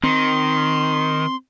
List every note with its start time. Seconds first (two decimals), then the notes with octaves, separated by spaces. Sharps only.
0.03 D#3 C4 C6